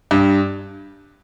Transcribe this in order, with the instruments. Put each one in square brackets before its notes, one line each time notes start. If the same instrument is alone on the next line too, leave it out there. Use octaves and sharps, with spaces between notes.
[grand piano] G2